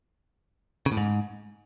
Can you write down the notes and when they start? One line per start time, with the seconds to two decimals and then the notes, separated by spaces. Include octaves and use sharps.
0.86 C#3
0.92 A2
0.97 G#2